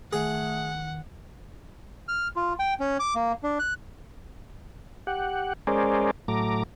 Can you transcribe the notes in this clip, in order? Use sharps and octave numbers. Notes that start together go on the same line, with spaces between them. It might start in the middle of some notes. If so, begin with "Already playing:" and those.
D#3 A3 G#4 F#5
F6
F4
G5
C#4
D6
A#3
D4
F#6
G4 F#5
G#3 C#4 G#4 A#4 C5 D5
A2 F#3 A3 A#5 D6